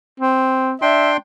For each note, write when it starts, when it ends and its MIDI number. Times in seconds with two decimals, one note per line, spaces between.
0.20 0.73 60
0.82 1.17 62
0.82 1.11 76
0.82 1.17 79
0.82 1.17 84